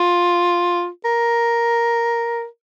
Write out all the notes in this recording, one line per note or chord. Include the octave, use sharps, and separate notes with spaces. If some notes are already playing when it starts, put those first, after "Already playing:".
Already playing: F4
A#4